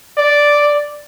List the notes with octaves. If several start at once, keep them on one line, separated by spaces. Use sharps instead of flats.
D5